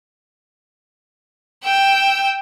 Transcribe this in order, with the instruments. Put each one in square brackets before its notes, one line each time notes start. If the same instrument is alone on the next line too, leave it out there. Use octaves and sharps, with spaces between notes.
[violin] G5 E6